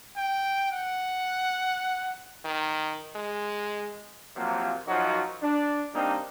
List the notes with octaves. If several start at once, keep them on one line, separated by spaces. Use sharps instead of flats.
G5
F#5
D#3
G#3
C3 F3 F#3 A#3
F#2 F3 F#3 D#4 F#4
D4
G3 A#3 C4 D4 D#4